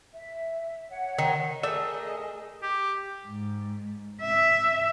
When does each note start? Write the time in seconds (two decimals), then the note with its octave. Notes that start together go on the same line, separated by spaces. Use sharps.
0.13 E5
0.89 C#5 F#5
1.19 D#3
1.63 A3 G#4 A#4 D5 D#5 E6
2.62 G4
3.27 G#2
4.21 E5